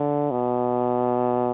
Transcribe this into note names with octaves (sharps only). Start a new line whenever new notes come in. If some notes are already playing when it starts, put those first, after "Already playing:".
Already playing: D3
B2